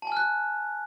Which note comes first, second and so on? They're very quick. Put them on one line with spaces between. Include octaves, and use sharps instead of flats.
A5 G#5 F6 F#6